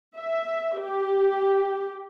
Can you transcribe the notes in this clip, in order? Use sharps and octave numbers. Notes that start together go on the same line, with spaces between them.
E5
G4